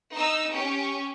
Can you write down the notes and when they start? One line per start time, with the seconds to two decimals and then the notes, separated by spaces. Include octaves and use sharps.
0.14 D#4 E6
0.52 C#4 G4 G5